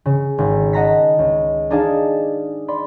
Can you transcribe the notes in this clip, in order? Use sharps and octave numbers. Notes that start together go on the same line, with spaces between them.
C#3
G#1
D#5 F#5 A5 A#5 A#6 B6
C#2
D4 D#4 G#4 D5 F5 A5
D5 B5 C6